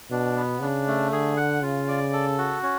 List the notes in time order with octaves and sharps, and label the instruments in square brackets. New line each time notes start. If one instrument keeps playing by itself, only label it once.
[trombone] B2 [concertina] D4
[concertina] B3
[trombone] C#3 [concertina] D4
[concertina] A3
[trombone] D3 [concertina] G#4
[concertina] F#5
[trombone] C#3 [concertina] F4
[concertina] D5
A4
F#4
C#4